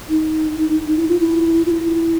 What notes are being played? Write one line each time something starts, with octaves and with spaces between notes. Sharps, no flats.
D#4
E4
F4
E4
F4
E4